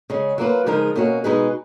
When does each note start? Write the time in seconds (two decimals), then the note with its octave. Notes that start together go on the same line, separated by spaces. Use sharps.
0.10 C#3 G#3 C#4
0.38 F#3 A#3 F4 B4
0.66 C#3 F3 G#3 D#4 A#4
0.96 B2 A#3 C#4 F#4
1.24 B2 G#3 D#4 G#4 B4